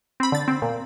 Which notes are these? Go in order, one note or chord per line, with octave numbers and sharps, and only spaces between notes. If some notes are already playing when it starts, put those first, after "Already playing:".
C4 B5
D3 A6
C4
A#2